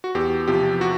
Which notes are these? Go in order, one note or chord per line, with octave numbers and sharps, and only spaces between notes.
F#4
E2 G4
C3 F3 G4
F#4